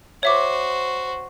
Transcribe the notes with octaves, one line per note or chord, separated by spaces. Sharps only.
F#4 C5 C#5 E5 D6